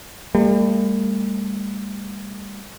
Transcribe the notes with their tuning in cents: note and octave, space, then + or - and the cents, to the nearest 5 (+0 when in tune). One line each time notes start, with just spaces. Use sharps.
G3 +35 A#3 -45